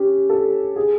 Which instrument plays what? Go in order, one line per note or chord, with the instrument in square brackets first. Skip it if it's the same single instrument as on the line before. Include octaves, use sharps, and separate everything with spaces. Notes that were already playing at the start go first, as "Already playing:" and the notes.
Already playing: [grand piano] C#4 G4
A4
G#4